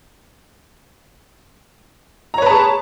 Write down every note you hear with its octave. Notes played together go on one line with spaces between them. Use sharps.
G#4 B4 C#5 A5 A#5